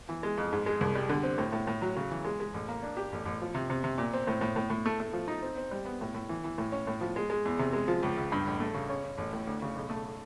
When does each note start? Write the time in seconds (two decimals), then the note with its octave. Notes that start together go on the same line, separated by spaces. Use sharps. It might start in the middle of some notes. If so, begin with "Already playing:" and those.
0.09 E3
0.23 G#3
0.37 F2
0.52 G#2
0.66 G#3
0.81 C2
0.95 G3
1.09 D3
1.23 C4
1.38 A2
1.52 A2
1.67 A2
1.82 F#3
1.96 C#3
2.11 E3
2.25 G#3
2.40 G#3
2.54 A1
2.68 A#3
2.83 D4
2.97 G4
3.12 A1
3.26 A1
3.41 F3
3.55 C3
3.70 C3
3.84 C3
3.98 A#2
4.13 C4
4.27 A2
4.41 A2
4.56 A2
4.70 A2
4.86 A3
5.00 A3
5.13 F3
5.28 D#4
5.42 C4
5.57 C4
5.71 G3
5.85 B3
6.01 A2
6.14 A2
6.29 E3
6.44 E3
6.58 A2
6.72 C#4
6.87 A2
7.01 F3
7.16 G#3
7.30 G#3
7.45 E2
7.59 C3
7.73 G#3
7.88 F3
8.03 C#2
8.17 C#2
8.32 G2
8.47 A1
8.60 A3
8.74 C#3
8.90 C#4
9.04 C#4
9.18 A1
9.33 A2
9.47 D2
9.62 C#3
9.76 B1
9.90 A3